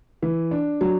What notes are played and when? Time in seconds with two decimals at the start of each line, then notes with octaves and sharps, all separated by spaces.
0.22 E3
0.51 D4
0.81 F#3